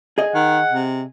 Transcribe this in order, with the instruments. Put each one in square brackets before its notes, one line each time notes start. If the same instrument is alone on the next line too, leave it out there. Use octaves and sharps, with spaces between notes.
[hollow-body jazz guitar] G#4 D#5
[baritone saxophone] D#3 [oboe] F#5
[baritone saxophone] C3